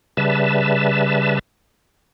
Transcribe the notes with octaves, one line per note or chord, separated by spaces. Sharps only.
C#3 G3 B4 E5 A5